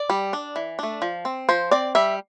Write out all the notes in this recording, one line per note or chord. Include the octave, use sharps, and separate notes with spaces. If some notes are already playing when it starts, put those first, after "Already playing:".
Already playing: D5
G3
D4
E3
A3 D4
F3
C4
F3 C5
C4 D5
G3 E5